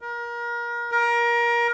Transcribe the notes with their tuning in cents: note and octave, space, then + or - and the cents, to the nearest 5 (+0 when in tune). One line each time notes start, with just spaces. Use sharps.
A#4 +30
A#4 +25